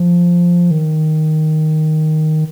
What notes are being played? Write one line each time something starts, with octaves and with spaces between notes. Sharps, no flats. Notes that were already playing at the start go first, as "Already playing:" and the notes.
Already playing: F3
D#3